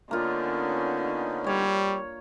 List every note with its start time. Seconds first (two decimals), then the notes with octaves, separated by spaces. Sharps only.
0.11 D3 A#3 B3 C#4 D#4 F4
1.47 G3 C#5